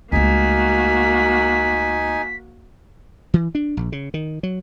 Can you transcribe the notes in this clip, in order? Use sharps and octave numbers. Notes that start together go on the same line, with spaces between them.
C#2 A3 A#3 D#4 F#4 G#5 B6
E3
D4
A#1
C#3
D#3
F#3